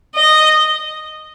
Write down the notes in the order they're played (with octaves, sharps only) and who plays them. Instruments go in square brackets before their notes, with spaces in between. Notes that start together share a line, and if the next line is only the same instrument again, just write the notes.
[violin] D#5